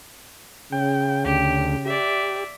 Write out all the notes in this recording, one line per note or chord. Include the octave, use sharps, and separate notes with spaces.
C#3 G5
D2 G4
G4 D5 E5